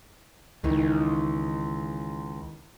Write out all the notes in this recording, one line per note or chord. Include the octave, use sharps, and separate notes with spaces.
C#2 D#3 E3 D#4